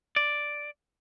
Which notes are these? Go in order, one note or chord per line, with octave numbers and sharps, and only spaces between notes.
D5